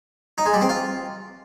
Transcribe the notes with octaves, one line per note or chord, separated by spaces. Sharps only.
D#4
G#3
G3
C4
F4